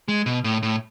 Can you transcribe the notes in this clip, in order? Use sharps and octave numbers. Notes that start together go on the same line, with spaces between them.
G#3
B2
A2
A2